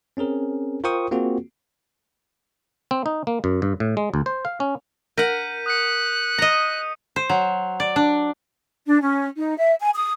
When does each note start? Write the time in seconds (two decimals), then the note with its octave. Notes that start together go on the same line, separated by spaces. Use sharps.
0.17 C4 C#4 G#4 A#4
0.84 F4 A#4 C5 G5 C#6 D#6
1.11 A#3 C4 F4 F#4 G#4
2.91 C4
3.06 D#4
3.27 A#3
3.44 F#2
3.62 G2
3.80 A2
3.97 G#3
4.14 D2
4.26 C5
4.45 F5
4.60 C#4
5.17 A#4 F#5 G6 B6 D#7
5.66 D#6 F#6 C#7
6.38 D#5 A#5
7.16 C5
7.29 F#3
7.80 D5
7.96 D4
8.87 D4
9.01 C#4
9.38 D#4
9.58 E5
9.80 G#5
9.94 D#6